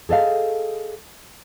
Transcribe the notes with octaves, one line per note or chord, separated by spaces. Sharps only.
G#4 A4 D#5 F5